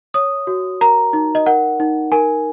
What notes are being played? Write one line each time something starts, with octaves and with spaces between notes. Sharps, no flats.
C#5 D#6
F#4
A#4 A#5
D#4
D#5
A#4 F#5
D#4
A#4 G#5